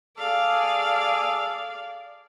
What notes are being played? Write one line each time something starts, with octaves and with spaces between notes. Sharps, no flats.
G#4 A4 D5 F5